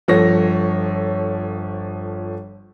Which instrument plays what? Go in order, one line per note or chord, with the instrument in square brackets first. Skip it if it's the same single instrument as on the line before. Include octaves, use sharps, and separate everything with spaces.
[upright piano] G1 F3 A4 C#5 A#6